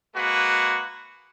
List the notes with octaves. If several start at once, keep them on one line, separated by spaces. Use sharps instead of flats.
G#3 A#3 F#4 B4